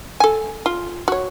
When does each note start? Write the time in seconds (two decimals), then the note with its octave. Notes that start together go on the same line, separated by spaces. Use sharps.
0.20 A4 G#5
0.66 F4
1.08 F#4 C#5